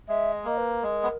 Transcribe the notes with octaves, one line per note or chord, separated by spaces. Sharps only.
G#3 E5
D#5
A#3
B4
G#3 A#4
B3